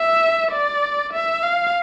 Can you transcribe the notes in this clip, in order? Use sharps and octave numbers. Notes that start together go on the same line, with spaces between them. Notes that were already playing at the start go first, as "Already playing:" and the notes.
Already playing: E5
D5
E5
F5